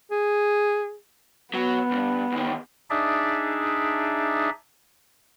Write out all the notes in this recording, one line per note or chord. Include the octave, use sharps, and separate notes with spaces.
G#4
F#3 B3
C2 G2
E2 D#3
D4 D#4 G#4 D5 E5